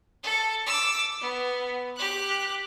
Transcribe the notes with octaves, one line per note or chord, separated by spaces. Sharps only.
A4
D6 E6
B3
G4 F#6